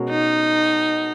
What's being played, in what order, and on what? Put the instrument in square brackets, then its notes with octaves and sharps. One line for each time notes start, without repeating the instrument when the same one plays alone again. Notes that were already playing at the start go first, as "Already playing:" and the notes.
Already playing: [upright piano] B2 G#3 C#4 F#4 A#4
[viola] D#4